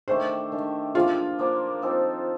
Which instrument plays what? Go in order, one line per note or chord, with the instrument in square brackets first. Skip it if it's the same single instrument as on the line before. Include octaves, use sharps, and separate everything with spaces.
[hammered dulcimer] D#3 A3 D4 G4 [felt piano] C5
[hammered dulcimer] D#3 A3 D4 G4
[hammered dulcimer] F3 A#3 D4 [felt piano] F4
[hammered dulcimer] F3 A#3 D4
F3 C4 D#4 A4